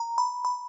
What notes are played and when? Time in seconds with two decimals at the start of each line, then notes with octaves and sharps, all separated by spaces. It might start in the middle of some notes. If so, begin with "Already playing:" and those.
Already playing: A#5
0.18 B5
0.45 B5